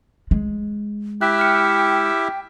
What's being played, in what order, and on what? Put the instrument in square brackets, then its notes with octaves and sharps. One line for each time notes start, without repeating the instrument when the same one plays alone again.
[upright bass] G#3
[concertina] E4 G4 E5 [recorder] G5 [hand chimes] F#6
[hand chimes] F6 C#7